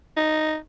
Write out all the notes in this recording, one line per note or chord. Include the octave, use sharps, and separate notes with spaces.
D#4